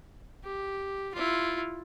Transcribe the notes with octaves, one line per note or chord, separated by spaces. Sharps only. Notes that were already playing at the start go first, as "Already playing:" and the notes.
G4
E4 F4